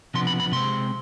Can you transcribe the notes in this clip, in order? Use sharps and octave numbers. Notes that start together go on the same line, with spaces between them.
C3 F3 B3 D4 C6
B5
B5
C3 G#3 C4 C6